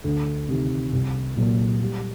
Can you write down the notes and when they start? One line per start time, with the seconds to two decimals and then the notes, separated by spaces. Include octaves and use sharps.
0.04 D2
0.48 C3 D#3
0.93 C2
1.36 A#2 F#3 A#3
1.81 G3